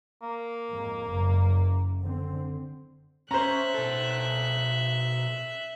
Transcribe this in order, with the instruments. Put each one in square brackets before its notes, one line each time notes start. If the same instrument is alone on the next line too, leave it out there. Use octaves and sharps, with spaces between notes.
[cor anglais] A#3
[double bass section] F2 G#2 G#3
F#1
D3 C4
[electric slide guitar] C#4 [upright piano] C5 A#5 [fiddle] E5 F#6
[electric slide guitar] B2 A4